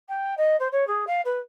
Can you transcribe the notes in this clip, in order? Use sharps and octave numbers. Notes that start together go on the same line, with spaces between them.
G5
D#5
C5
C#5
G#4
F5
B4